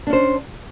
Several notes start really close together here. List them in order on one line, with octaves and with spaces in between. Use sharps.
D4 C#4 C5